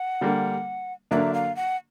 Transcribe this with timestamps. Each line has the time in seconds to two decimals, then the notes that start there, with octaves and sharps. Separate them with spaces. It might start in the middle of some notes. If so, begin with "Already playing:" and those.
Already playing: F#5
0.21 D3 G3 A#3
1.11 D3 F#3 A#3 D4 E5
1.34 F5
1.56 F#5